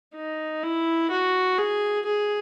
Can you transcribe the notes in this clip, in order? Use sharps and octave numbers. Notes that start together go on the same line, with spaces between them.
D#4
E4
F#4
G#4
G#4